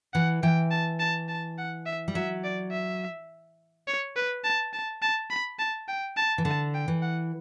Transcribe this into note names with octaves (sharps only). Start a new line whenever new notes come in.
E3 F#5
E3 G5
A5
A5
A5
F#5
E5
G3
F#3 E5
D5
E5
C#5
B4
A5
A5
A5
B5
A5
G5
A5
E3
D3 A5
G5
E3
F#5